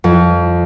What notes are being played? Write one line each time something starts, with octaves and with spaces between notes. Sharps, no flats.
F2